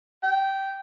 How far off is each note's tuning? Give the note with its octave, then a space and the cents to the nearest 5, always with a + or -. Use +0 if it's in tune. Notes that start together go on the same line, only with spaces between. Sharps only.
G5 -15